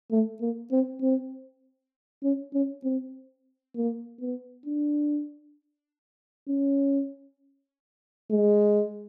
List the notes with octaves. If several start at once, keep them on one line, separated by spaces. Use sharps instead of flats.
A3
A#3
C4
C4
C#4
C#4
C4
A#3
B3
D4
C#4
G#3